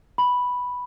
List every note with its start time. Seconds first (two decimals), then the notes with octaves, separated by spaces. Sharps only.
0.18 B5